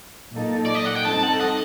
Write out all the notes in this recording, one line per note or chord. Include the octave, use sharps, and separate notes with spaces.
A#2 F#3 A#3 D#4 A4
D5
D#5
F#5
G5
G3 C4 D#4 A4 A5
F#5
D#5